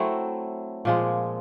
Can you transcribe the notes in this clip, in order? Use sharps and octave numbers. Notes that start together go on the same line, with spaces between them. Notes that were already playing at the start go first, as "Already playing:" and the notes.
Already playing: F#3 A3 C4 E4
A#2 F3 G#3